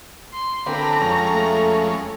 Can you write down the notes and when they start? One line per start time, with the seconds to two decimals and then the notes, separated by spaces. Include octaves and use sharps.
0.33 C6
0.66 D3 C4 A4 B4 G5 A#5
1.01 F2 G#3 C#4
1.34 A3